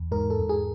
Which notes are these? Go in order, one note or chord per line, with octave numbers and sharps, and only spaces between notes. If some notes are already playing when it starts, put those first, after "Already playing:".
Already playing: E2
G#2 A#4
A4
G#2
G#4